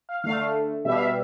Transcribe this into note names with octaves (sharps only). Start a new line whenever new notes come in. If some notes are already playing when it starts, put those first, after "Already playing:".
F5
D3 A3 F5
B2 G3 E5
F5
E5